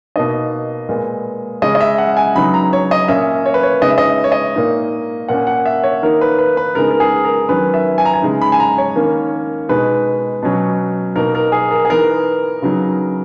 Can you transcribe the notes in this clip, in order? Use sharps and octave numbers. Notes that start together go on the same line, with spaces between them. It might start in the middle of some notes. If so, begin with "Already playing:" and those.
B2 A#3 D#4 D#5
A#2 G#3 B3
C#3 G#3 C#4 D#5
D#5
E5
F#5
G#5
C#3 F#3 B3 D#4 B5
A#5
C#5
D#5
A#2 A#3 C#4 E5
C#5
B4
C#5
C#3 G#3 B3 D#4 D#5
E5
D#5
C#5
D#5
A#2 A#3 D#4
A#2 A#3 C#4 F#5
F#5
E5
C#5
D#3 A#3 D#4 A#4
B4
B4
B4
C#3 G#3 B3 D#4 A#4
A#4
G#4
A#4
D#3 F#3 C#4 B4
E5
G#5
A#5
G#5
C#3 G#3 D#4
B5
G#5
A#5
C#5
D#3 A#3 C#4
B2 G#3 D#4 B4
B2 F#3 C#4
B2 A#3 D#4 A#4
A#4
G#4
A#4
G#4
E3 B3 D#4 A#4
C#3 F#3 B3 D#4